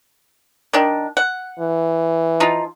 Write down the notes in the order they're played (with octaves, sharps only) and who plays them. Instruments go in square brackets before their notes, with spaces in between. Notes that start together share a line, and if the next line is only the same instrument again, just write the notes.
[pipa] D#3 D4
F#5
[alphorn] E3
[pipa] F3 D#4 F4